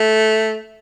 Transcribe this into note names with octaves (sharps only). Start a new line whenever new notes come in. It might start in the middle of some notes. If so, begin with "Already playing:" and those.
Already playing: A3